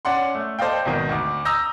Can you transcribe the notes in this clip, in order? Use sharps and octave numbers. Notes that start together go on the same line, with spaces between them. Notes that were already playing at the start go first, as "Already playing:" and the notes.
C#4 D5 F#5 C6
A3
A4 C5 D5 D#5 F5 G5
G#1 B2 D#3
D2 D6
A#5 D#6 E6 G6 A#6